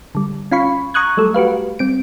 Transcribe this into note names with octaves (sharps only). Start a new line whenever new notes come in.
D3 G3
C#4 F4 F5 B5 C#6
A#5 C#6 D#6 F#6 G#6
F#3 G3 A3 A4
F#4 G4 B4 F5
G3 C4 D7